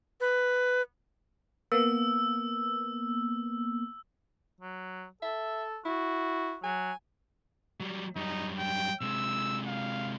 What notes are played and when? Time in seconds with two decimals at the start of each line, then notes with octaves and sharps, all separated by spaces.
0.21 B4
1.72 A#3 B3 E6
4.61 F#3
5.22 A4 E5
5.85 E4 F#4
6.64 F#3 G#5
7.80 F#3 G3
8.16 F#2 G3 D#4
8.59 G5
9.01 C3 G#3 E6
9.66 F5